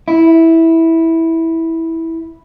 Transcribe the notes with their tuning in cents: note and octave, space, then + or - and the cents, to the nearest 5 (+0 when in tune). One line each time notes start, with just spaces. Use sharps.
E4 -10